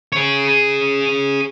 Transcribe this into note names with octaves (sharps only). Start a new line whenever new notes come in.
G#4 C#5